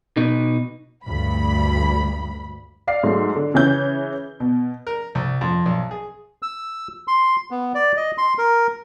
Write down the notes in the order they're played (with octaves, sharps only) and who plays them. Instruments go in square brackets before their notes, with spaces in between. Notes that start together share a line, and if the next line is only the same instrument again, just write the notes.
[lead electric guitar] B2 D#4
[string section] D2 G2 B5
[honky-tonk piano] D5 F5 C7
G#2 F#3 A3
D3
C#3 E3 C#4 G6
B2
[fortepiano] A#4
C2
F2
B1
G#4
[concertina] E6
C6
B3
D5
D#5
C6
A#4